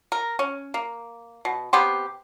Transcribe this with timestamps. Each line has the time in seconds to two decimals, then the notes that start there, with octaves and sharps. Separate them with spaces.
0.12 A#4
0.39 C#4
0.74 A#3
1.45 B2
1.73 C3 B3 G4 C6